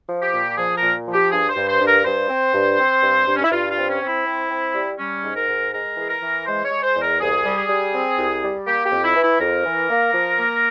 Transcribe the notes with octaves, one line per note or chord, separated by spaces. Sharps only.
F3
G4
A#2
F3 G#4
A#4
A#2
F3
G4
G2 G#4
C5
G2
C5
G2
A#4
G2 C5
C4
G2
C4
G2
G2
C#4
E4
G2 F4
F4
C4
C#4
C4
E4
C4
C4
G3
G3 C#4
G#2
A#4
G#2
G#3 A#4
E3 G#4
A#4
E3
G#3 C5
C#5
G#3
C5
E2
A#4
C2 G#4
G3
G#4
G3
C4
C2
G3
A#3 G4
G4
F2
E4
E3
E4
F2 A#4
E3
A#3
F3
A#3